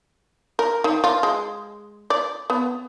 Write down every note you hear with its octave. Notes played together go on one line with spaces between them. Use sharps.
A#4
D#3
F4
G#3
D5
B3